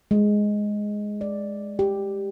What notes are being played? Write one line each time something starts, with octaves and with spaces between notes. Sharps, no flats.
G#3
D5
G4